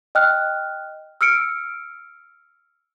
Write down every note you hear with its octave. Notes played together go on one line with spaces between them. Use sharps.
D#5 G5 F6 F#6
E6 F6 C#7 D7